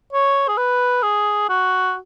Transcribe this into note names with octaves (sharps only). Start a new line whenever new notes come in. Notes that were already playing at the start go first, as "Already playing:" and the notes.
C#5
G#4
B4
G#4
F#4